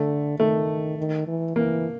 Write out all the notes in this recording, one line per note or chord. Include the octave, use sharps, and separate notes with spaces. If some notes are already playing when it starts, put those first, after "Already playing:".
Already playing: D3 A3
D#3 A3
D#3
E3
E3 A#3